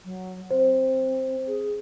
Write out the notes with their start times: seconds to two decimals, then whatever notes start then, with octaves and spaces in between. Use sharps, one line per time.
0.05 F#3
0.51 C4 C5
1.47 G#4